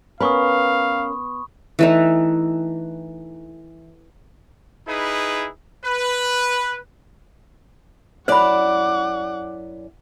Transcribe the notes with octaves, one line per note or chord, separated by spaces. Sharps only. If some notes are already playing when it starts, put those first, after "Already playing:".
B3 C#4 A#4 B4 F5 B5 C#6 D#6
E3 A3 D#4
D#4 E4 G#4 B4 B5
B4
F#2 E4 C5 D5 F#5 B5 D6